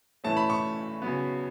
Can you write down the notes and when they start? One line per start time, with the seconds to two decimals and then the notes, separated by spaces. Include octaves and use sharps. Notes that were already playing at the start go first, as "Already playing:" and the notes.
0.24 A2 E3 A3 C#4 E4 A5
0.37 B5
0.50 C#6
1.02 C#3 F#3 B3